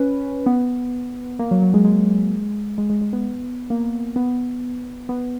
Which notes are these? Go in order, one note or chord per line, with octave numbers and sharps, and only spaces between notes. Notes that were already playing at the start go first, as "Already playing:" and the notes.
Already playing: C#4 B4
B3
A#3
F#3
F#3
G#3
G#3
G#3
G#3
G#3
B3
A#3
B3
B3